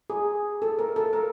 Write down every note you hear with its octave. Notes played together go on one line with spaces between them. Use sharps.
G#4
A4
A#4
A4
A#4